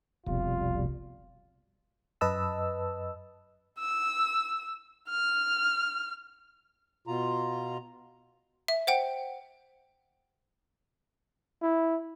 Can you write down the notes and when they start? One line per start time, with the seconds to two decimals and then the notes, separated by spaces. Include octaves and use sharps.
0.27 F1 C2 F2 B2 G3 F4
2.21 F#2 B4 D#5 A5 E6
3.79 E6
5.10 F6
7.07 B2 F4 A#5
8.68 E5
8.87 C5 F#5 G5
11.63 E4